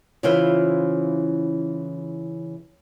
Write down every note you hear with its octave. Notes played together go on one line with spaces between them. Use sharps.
C#3 E3 E4 F4 C5